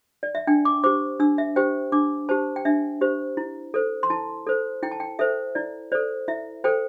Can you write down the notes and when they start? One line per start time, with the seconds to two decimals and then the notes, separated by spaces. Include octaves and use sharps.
0.23 D5
0.35 E5
0.47 D4 G5
0.65 D6
0.84 G4 C5 D6
1.20 D4 E6
1.38 E5
1.56 G4 C5 G5
1.92 D4 D6
2.29 G4 C5 A5
2.56 G5
2.65 D4 E5
3.01 G4 C5
3.37 E4
3.74 A4 C5
4.03 C6
4.10 E4 A5
4.47 A4 C5
4.83 E4 G5
4.91 A5
5.00 G5
5.19 A4 C5 E5
5.55 E4 D5
5.92 A4 C5 D5
6.28 E4 E5
6.64 A4 C5 G5